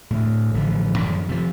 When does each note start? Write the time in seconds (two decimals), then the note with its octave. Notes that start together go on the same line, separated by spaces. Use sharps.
0.11 D2 A2
0.54 A1 D3 F3
0.98 F#2 D#3 F3
1.29 C3 F3